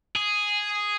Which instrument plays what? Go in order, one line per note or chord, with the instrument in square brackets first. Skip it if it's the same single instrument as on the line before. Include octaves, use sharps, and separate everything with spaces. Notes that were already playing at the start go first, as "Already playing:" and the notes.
[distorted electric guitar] G#4